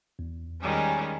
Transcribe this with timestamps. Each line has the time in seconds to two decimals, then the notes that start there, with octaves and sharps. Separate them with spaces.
0.19 E2
0.61 D#3 G3 G#3 C#4